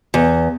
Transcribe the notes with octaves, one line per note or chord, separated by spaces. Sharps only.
E2